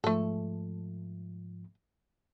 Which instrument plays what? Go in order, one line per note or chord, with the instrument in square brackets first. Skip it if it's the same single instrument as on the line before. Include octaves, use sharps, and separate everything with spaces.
[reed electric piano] G#2 F3 [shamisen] A3 A4